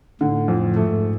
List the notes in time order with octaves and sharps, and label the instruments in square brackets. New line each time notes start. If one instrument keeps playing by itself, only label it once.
[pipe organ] A2 [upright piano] D3
[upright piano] F2
[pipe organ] G#2 [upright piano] A3